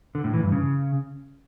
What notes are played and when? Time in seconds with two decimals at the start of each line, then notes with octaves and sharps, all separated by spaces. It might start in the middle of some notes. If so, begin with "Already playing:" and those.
0.15 D3
0.24 A2
0.33 E3
0.43 G2
0.52 C#3